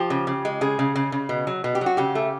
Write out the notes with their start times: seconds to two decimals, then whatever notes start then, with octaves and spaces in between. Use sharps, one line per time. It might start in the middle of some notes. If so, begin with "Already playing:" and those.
Already playing: F3 G4
0.10 C#3
0.27 C#3
0.45 G#3
0.61 C#3 G#4
0.79 C#3
0.96 C#3
1.12 C#3
1.29 B2
1.47 F#3
1.64 B2
1.75 G4
1.81 F#3
1.86 F#4
1.97 C#3 G4
2.15 A3